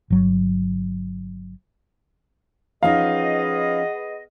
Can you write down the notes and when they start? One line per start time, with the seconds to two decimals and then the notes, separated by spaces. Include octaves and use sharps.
0.10 G1 F#3
2.83 F3 B3 C#4 D#4 G#4 D#5 F5